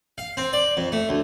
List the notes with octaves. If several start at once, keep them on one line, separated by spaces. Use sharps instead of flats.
F5
C4
D5
F2
A3
D2